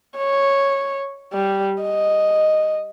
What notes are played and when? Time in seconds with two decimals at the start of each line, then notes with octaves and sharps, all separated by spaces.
0.17 C#5
1.33 G3
1.83 D#5